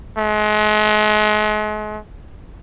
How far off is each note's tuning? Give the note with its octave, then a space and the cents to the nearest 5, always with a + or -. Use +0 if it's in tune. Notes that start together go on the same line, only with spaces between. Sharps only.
G#3 +40